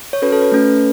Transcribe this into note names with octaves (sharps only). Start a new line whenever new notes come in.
C#5
C#4 F#4 A4 B4
A4
B4
A3 C#4 A4